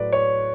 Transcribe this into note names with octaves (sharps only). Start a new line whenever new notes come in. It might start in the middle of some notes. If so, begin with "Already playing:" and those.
Already playing: A2 F#3 B4 D5
C#5